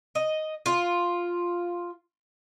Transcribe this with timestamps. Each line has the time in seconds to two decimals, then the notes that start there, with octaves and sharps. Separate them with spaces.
0.15 D#5
0.66 F4